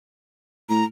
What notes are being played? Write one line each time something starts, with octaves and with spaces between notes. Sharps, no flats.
A2 A#5